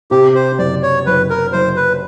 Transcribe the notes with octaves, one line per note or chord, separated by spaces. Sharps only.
C3 G4
C5
F#1 D5
C#5
F#1 B4
A#4
F#1 C5
B4